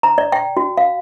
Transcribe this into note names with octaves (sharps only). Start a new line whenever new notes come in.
A#5
D5
G5
F#4
F5